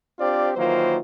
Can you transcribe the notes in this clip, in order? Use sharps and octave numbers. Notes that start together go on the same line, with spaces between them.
C4 D4 F4 G4 C5 D5
D#3 E3 F#3 A#3 F4 C5